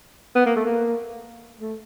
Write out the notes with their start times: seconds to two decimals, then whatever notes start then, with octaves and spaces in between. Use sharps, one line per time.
0.35 B3
0.46 A#3
0.56 A3
0.65 A#3
1.61 A3